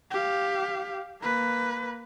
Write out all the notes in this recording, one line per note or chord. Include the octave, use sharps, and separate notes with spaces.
G4 F5
A#3 B4